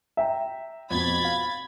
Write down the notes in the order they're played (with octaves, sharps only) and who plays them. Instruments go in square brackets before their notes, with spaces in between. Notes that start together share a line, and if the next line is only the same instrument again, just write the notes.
[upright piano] E5 G5 A#5
[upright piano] F2 B2 [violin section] B5 G#6 A6
[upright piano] F5